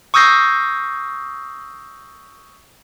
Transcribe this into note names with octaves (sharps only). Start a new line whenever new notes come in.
C#6 D#6 E6 G6 A#6 C7